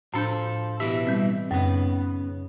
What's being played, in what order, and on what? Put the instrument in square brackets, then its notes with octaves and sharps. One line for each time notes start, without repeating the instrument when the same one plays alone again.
[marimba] A2 D4 G6 [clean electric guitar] F3 A4
[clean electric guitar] B2 E3 E5 [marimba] G4
[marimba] G3 C4
[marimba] F#2 [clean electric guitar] C#3 B3